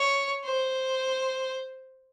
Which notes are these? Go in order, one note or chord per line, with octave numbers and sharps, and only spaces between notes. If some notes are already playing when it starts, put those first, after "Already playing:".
Already playing: C#5
C5